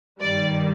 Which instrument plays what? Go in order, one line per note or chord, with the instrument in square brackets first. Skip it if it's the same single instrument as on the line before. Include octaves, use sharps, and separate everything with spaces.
[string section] G2 D#3 G3 D5